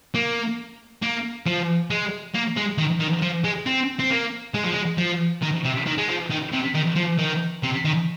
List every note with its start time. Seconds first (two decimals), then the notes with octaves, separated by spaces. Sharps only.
0.15 A#3
1.02 A#3
1.46 F3
1.90 G#3
2.34 A#3
2.56 G#3
2.78 D#3
3.00 D#3
3.22 F3
3.44 G#3
3.66 C4
4.00 C4
4.11 A#3
4.54 G#3
4.64 F3
4.72 G#3
4.98 F3
5.43 D#3
5.65 C3
5.87 D#3
5.98 G#3
6.09 F3
6.31 D#3
6.53 C3
6.75 D#3
6.96 F3
7.19 D#3
7.63 C3
7.85 D#3